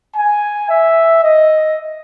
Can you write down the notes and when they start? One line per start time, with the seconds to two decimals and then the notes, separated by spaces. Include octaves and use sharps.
0.16 G#5
0.69 E5
1.23 D#5